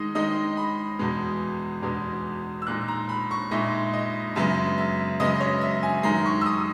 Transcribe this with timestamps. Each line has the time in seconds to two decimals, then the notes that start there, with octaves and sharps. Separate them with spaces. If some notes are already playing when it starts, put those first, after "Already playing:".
Already playing: D#3 G#3 D#4 D#5
0.15 D#3 G#3 D#4 D#5
0.57 B5
0.99 E2 B2 G#3 B3
1.83 E2 B2 G#3 B3
2.62 E6
2.67 A#2 G#3 D#4 F#6
2.88 A#5
3.09 B5
3.31 C#6
3.51 A#2 G#3 D#4 E5
3.93 D#5
4.35 F#2 C#3 G#3 B3 E5
4.78 E5
5.20 F#2 C#3 G#3 B3 D#5
5.40 C#5
5.61 E5
5.83 G#5
6.03 F#2 D#3 G#3 A#5
6.25 C#6
6.41 E6
6.46 D#6